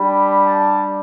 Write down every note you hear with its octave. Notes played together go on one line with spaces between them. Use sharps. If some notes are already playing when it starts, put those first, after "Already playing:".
Already playing: G3 D4 G4 B5
A5